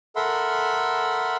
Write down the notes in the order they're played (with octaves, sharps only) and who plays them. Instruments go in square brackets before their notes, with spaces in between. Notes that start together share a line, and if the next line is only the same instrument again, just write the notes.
[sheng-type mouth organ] A4 A#4 E5 F#5 B5 C6